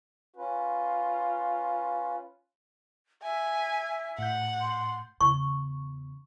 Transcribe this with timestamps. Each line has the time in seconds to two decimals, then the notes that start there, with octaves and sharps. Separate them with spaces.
0.36 C#4 F4 B4
3.23 E5 G#5
4.19 A2 F#5 G6
4.61 C6
5.21 E2 C#3 C#6